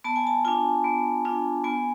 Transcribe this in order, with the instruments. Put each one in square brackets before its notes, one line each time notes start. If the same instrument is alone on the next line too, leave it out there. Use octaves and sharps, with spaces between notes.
[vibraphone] B3 A5
G#5
A5
D4 F4 G#5
B3
D4 F4
B3 G#5